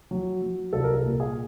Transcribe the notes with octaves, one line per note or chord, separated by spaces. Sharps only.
F#3
F#3
C2 A4
A#4
A4
A#2
G#4